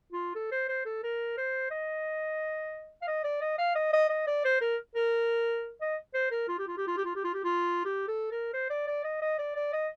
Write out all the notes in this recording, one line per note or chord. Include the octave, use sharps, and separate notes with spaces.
F4
A4
C5
C5
A4
A#4
C5
D#5
F5
D#5
D5
D#5
F5
D#5
D#5
D#5
D5
C5
A#4
A#4
D#5
C5
A#4
F4
G4
F4
G4
F4
G4
F4
G4
F4
G4
F4
G4
A4
A#4
C5
D5
D5
D#5
D#5
D5
D5
D#5